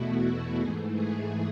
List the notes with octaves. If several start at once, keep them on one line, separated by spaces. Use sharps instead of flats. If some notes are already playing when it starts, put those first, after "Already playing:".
Already playing: E2 B2 A3 E4 F#4
F#4
G#2 E3 A3 G#4
G#4